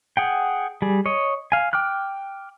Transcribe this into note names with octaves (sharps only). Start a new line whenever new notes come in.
G#4 F#5 G5
G3 G#4
C#5 D#5
F5 G#5
G5 D6 F6 F#6